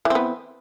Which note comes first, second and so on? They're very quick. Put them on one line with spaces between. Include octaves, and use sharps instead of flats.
E3 C4 B3